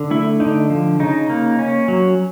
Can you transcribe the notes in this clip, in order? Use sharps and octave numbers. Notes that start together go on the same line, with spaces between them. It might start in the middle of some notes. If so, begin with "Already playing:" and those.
Already playing: D3
A3 E4
D3 D#4
F3
C#3 D#4
A#3
C#4
F#3